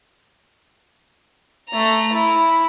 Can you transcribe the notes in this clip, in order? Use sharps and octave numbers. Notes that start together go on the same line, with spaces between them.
A3 A#5
E4